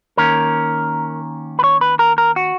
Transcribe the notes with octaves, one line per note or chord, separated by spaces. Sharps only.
D#3 A#3 C#4 A#4
B4
C#5
B4
A#4
A#4
F#4